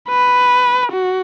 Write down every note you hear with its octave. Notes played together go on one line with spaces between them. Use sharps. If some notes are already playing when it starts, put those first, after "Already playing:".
B4
F#4